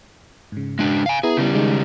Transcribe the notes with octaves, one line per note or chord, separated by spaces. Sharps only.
G#2 C#3
G#3 D4
F5 G#5
B3 E4 G#4 A#5
C#3 G3
D#3 G#3 D#4